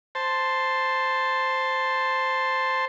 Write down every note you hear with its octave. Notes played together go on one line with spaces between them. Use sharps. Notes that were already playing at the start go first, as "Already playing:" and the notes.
C5 A5